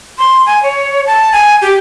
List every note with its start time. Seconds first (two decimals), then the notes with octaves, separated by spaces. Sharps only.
0.18 C6
0.46 G#5
0.63 C#5
1.06 A5
1.32 G#5
1.62 G4